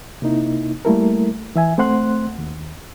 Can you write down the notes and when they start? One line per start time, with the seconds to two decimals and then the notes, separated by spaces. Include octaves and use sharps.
0.22 C3 A#3 D#4 E4
0.85 G3 A3 A#3 E4 A4 A#4
1.56 E3 E5 G#5
1.78 A3 C4 C5 F#5 C6 F#6
2.39 D#2